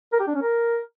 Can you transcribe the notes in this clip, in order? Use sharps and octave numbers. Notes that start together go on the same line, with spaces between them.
A#4
G4
D4
C#4
A#4